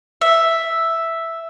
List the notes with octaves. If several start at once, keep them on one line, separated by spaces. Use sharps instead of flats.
E5